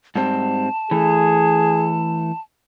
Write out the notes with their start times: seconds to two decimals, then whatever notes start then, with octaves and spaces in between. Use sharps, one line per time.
0.15 G#2 G3 C4 A5
0.91 E3 A3 G#4